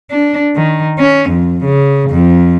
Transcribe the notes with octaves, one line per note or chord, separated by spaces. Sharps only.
D4
D#3
C#4
F2
C#3
F2